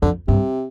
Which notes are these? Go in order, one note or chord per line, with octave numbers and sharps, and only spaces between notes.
F2 D3
G2 C3